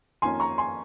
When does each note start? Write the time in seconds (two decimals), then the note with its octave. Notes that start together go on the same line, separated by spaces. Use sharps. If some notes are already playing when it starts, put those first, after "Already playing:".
0.22 F2 D#3 A#3 C#4 G#5 C6
0.40 A#5 C#6
0.58 G#5 C6